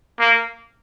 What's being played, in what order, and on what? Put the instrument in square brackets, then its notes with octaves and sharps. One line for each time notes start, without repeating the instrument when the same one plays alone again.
[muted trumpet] A#3